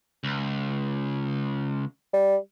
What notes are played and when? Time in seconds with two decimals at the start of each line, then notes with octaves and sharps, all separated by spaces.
0.24 C#2
2.13 G3